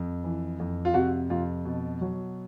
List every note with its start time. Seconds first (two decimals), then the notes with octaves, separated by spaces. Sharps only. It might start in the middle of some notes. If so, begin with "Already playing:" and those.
Already playing: F2
0.24 E3
0.60 F2
0.85 F4
0.94 C3 F#4
1.30 F2 F4
1.65 B2
2.01 F#3